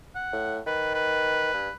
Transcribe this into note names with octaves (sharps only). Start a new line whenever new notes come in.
F#5
A2
D#3 B4
B4
G2